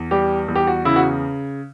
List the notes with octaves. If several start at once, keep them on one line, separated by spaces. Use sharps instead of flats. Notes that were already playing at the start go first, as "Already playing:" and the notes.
Already playing: E2
G3 G4
E2
G4
F#4
C#3 E4
F#4